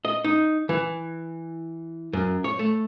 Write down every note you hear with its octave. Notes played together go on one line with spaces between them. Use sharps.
D#5
D#4
E3
F#2
C#5
A3